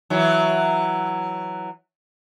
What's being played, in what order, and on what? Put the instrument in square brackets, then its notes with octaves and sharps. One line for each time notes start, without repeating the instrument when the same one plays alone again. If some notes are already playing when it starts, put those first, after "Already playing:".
[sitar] E3 F#3